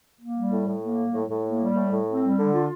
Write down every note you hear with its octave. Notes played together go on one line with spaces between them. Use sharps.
A#3
G3
A2
A2
A#3
G3
A2
A2
A#3
G3
A2
A2
C4
G3
D3
F4